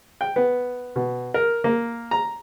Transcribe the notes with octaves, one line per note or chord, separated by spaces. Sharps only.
G5
B3
B2
A#4
A#3
A#5